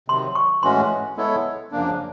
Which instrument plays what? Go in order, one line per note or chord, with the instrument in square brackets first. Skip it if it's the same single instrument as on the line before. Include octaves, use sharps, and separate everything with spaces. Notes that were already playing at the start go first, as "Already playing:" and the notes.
[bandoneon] C3 D#3 F#3 [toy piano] C6
[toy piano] C#6
[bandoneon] A2 E3 G#3 C#4 F#4 [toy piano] C6
[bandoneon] G#3 B3 E4 A4 C#5
F#2 C#3 F3 A#3 D4